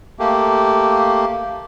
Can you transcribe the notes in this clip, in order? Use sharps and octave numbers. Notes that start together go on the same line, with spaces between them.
A3 A#3 G4